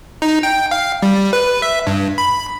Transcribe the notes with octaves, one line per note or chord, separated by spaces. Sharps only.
D#4
G5
F5
G3
B4
E5
G2
B5